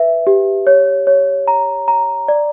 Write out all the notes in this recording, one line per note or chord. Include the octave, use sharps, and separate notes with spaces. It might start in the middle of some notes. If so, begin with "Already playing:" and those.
Already playing: B4 E5
G4
C#5
C#5
A#5
A#5
D5